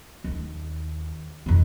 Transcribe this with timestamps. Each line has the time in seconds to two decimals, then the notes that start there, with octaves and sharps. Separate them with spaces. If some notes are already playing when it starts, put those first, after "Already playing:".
0.24 D#2
1.46 F2 D#3